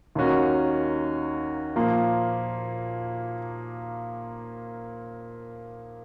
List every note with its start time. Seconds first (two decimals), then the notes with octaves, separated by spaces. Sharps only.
0.15 D#2 D#3 A#3 C#4 F#4
1.76 A#2 F3 A#3